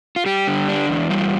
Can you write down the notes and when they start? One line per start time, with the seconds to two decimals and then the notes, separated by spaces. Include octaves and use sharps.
0.16 F4
0.26 G3 G4
0.48 D3
0.69 D4
0.89 E2
1.10 G3 F4